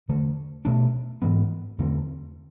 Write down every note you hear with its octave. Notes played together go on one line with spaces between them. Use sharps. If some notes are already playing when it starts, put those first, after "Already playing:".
E2 D3 A3
B2 A3 D4
G#2 E3 G#3 B3
E2 D3 A3 C4